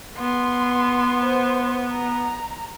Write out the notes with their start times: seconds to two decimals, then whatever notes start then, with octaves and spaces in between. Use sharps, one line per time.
0.17 B3 C6
1.22 C5
1.92 A#5